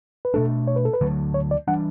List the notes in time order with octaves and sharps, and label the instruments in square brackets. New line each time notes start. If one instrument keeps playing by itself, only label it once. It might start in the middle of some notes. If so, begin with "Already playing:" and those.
[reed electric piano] B4
[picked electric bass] B2 A3 D4 [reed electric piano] A4
[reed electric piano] C#5
B4
A4
B4
[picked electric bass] D2 D3 F#3 A3
[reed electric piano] C#5
D5
[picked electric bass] E3 G3 D4 [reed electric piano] F#5